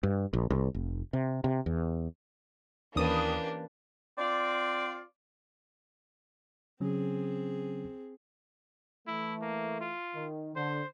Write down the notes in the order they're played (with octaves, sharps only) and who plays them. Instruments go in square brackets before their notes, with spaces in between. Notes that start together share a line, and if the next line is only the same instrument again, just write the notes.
[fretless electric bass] G2
A#1
C2
F1
C3
C3
E2
[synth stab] D#2 D#6 [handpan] E3 C#4 B4 [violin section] A#3 D4 G4
[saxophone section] C4 F4 D5
[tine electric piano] C#3 F#3 C#4 [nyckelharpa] C4 G#4
[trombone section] E3 A3 [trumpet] E4
[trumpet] A#3
F4
[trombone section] D#3
[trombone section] D3 [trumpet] C5